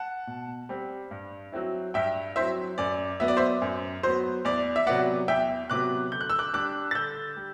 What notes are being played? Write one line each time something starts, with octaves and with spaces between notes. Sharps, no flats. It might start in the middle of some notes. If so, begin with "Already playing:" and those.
Already playing: F#5 A5
B2
G3 C4
G2
F#3 C4 E4
G2 E5 G5
F#3 C4 E4 C5 E5
F#2 D5
F#3 B3 E5
D5
C5 E5
F#2
F#3 B3 C5
E2 D5
E5
C3 F#3 B3 D5 F#5
E2 E5 G5
C3 F#3 B3 D6 F#6
D3 G6
F#6
E6
D6 F#6
G3 D4 D6 F#6
A6
D3 E6 G6
G3